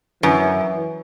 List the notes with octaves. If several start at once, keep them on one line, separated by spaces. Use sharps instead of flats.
F#2 E3